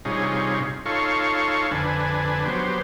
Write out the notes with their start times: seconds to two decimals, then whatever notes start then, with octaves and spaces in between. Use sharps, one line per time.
0.05 G2 C3 D#4 F4 G#4 C#5
0.86 D#4 F4 A4 C#5 F5 C#6
1.71 F2 D3 D4 B4 G#5
2.45 F#3 B3 G4 C5